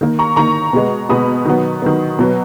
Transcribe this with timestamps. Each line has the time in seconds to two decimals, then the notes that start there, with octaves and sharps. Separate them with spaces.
0.01 D#3 A#3
0.19 A#5 C#6
0.36 D#3 A#3 A#5 C#6
0.73 B2 G#3 B3
1.09 B2 G#3 B3 B5 D#6
1.45 D#3 F#3 B3
1.82 D#3 F#3 B3
2.19 B2 F#3 B3